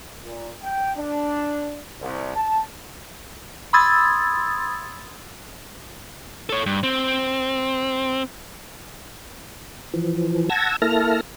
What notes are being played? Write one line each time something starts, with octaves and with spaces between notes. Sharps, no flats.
A#2
G5
D4
C2
A5
B5 C6 D#6 E6 G#6 A6
A4 C#5
G2
C4
E3 F3
F#5 A5 E6 G#6 A#6
A#3 E4 A4 A5 F6 A#6